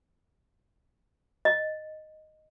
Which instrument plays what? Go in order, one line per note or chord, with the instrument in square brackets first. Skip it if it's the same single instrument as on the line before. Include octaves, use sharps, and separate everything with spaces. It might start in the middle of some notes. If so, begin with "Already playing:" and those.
[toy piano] D#5